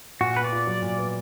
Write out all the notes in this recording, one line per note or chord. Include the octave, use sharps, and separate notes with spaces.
A#2 F#4
B3 B4
D5
F4
F#3
A#2
B3